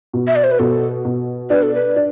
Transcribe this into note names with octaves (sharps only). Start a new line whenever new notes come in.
B2
E5
D5
C5
B4
B2 A4
B2
D4 B4
A4
B4
D4